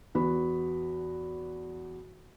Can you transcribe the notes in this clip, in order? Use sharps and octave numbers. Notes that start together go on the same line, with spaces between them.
E2 B3 F#4 B5